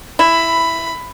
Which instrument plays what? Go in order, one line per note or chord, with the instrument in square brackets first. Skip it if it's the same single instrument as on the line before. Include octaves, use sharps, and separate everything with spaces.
[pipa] E4 [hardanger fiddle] B5